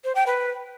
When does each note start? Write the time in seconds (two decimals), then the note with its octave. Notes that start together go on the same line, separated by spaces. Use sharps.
0.04 C5
0.15 G5
0.27 B4